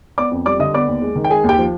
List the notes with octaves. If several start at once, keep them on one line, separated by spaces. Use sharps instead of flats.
B3 D5 D6
F2
G3 D5 D6
D3 D#5 D#6
B3 D5 D6
D#2
G#3
D#3
G5
G#3 G#4 G#5
D#2 G4 G5
F3